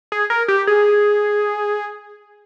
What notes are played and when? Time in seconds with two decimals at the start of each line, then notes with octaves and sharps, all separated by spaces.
0.12 G#4
0.30 A#4
0.48 G4
0.67 G#4